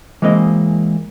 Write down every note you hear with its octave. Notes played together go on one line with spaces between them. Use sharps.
E3 G#3 A#3 C4 D#5